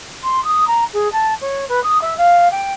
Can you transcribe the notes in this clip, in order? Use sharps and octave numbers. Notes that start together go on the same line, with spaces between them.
C6
D#6
A#5
G#4
A5
C#5
B4
D#6
E5
F5
G5